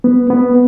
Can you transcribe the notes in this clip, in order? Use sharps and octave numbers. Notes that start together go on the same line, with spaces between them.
B3
B3